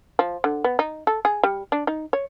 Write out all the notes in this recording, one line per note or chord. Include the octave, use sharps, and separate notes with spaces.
F3
D3
B3
D#4
A4
G#4
G3
D4
D#4
C#5